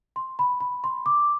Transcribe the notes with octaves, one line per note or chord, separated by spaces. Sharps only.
C6
B5
B5
C6
D6